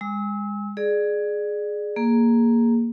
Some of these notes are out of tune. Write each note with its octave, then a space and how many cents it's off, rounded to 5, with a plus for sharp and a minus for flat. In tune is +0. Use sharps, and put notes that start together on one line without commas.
G#3 -25 E6 -35
G#4 +10 D5 +25
A#3 +0 G#4 +0